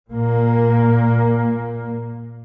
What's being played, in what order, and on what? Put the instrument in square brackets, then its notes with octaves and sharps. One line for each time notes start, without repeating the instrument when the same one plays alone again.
[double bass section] A#2 A#3